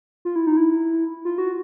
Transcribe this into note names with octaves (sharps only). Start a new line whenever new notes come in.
F4
E4
D#4
E4
F4
F#4